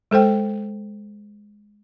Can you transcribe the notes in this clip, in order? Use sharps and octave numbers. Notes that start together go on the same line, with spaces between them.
G#3 A4 C5 G5